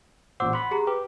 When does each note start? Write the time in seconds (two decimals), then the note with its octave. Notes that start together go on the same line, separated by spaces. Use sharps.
0.40 A1 A#2 C5 F#5 D6 E6
0.53 F#5 B5 C6
0.71 G4 G#4 A#5
0.87 G4 B4